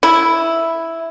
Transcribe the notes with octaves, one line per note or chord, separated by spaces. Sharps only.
E4